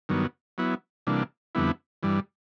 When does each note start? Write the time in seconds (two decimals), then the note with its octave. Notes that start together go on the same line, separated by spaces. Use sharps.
0.09 G2 D#3 F#3 B3
0.58 F#3 B3 E4
1.07 C3 E3 G3 A#3 D4
1.55 F2 D3 G3 B3 E4
2.03 G2 E3 G3